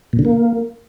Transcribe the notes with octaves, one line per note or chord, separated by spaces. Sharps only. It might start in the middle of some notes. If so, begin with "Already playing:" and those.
A#2
D3
A#3